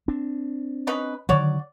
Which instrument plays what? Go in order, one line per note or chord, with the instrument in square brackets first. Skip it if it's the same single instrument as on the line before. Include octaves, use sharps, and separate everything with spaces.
[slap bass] C4 D4
[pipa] C#4 D#4 B4
[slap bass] D3 D#3 F#3 [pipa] F#4 C#5 D5